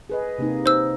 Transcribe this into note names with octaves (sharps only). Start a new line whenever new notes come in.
G#4 B4 D#5
C3 A#3 D#4
D#4 C5 E6